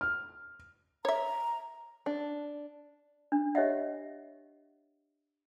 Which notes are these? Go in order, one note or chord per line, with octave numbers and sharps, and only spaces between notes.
F6
C#5 E5 A#5
D4
D4
G4 C#5 D#5 E5 F#5